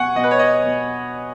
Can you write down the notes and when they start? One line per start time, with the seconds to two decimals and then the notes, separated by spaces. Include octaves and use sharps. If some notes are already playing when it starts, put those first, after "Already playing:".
Already playing: B2 F#5 G#5 C#6
0.15 B2 D#5
0.24 B4
0.31 C#5
0.39 D#5
0.63 B2